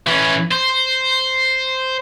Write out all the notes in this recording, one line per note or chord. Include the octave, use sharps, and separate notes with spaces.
E3 C#4
C5